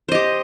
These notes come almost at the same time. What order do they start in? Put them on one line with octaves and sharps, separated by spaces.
C5 D#5 G4